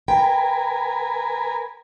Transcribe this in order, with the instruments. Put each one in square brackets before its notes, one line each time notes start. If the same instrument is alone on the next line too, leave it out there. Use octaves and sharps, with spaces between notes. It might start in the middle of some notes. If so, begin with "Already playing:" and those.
[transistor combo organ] A#4 B4 G#5 [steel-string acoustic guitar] G5